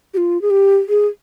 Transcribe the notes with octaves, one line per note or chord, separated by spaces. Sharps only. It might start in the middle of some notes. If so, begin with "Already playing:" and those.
G4
F4
G#4
G4
G#4